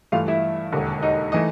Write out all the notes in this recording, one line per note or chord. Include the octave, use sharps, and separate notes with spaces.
G2 E3 A3 F4 F5
E4 E5
E1 D#2 D3
D#4 D#5
E3 A3 D#4 D#5